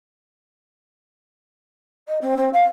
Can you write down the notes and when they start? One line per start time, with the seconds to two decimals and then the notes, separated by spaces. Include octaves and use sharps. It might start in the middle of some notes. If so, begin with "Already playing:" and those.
2.08 D#5
2.21 C4
2.37 C4
2.53 F5